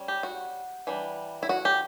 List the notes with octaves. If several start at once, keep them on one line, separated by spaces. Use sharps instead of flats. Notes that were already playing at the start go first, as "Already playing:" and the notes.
Already playing: G3 C#4
G4
F#4
E3 G3 D4
E4
F#4
G4